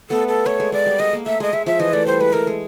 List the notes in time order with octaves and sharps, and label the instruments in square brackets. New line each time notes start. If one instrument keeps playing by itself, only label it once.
[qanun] A3 B3 [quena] A4
[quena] A4
[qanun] A3 [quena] C#5
[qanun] G#3
[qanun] G#3 [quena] D5
[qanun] G3
[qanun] G#3 [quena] D#5
[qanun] A#3
[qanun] A3 [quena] E5
[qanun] G#3 [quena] D#5
[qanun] G#3 [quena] E5
[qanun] F3 [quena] E5
[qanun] E3 [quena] D#5
[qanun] A3 [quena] D5
[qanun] G3 [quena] C5
[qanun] G#3 [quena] B4
[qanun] A3 [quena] A#4
[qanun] G#3